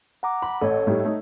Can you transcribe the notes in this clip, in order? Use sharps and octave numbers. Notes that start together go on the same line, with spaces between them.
F#5 A#5 D6
B5
A1 A4 C#5
A2 G3 D#4
A3 D#4